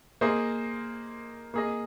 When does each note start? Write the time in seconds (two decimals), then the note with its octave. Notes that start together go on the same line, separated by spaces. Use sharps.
0.21 A#3 G#4 C5 D#5
1.54 A#3 G#4 D#5